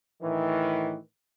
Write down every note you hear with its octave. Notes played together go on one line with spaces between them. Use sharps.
A2 D#3 E3